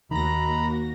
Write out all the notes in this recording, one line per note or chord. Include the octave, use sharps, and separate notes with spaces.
D#2 D#3 A#3 F#4 A#5 B5 A#6